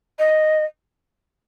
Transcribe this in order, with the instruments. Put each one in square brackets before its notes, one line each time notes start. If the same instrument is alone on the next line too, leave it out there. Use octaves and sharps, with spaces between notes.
[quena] D#5